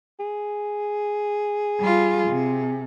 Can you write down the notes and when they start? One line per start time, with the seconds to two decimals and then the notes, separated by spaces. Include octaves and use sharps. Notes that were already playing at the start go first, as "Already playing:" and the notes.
0.20 G#4
1.80 G3 F4
2.27 C3